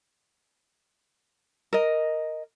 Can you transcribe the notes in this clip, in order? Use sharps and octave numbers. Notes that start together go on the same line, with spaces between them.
A#4 D#5